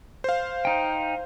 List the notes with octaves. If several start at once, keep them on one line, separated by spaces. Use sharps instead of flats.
C5 F5
D#4 G5